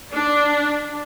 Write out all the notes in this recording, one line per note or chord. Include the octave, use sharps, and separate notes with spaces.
D4